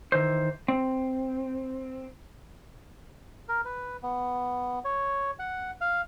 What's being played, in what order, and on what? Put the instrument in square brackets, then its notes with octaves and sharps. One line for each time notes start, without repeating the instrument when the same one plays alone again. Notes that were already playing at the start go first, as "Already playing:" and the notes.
[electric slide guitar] D#3 E3 C5
C4
[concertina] A#4
B4
B3
C#5
F#5
F5